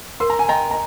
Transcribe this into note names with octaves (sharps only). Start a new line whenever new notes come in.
A#4 C6
A#5
G#5
D#5 G5 A#5
A#5